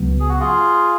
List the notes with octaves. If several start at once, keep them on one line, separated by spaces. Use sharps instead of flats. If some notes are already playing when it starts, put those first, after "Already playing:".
Already playing: C#2 C#3 F#3 B3
G#4
F#4
F4 G#4